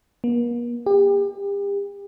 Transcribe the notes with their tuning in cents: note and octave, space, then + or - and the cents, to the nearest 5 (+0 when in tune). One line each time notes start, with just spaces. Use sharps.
A#3 +45
G4 +35